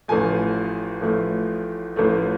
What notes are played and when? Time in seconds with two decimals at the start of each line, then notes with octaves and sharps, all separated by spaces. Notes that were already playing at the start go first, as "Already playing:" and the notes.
0.08 A1 A2 F3 A3 G#5
1.02 A1 A2 F3 A3
1.96 A1 A2 F3 A3